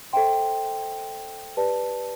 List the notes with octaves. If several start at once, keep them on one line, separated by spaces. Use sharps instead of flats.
A4 C5 E5 G5 C6
G4 B4 D5 A5